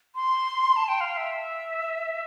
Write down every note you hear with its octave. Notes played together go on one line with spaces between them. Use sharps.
C6
A5
G5
F5
F5
E5